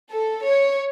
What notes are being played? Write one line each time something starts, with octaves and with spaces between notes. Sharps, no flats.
A4
C#5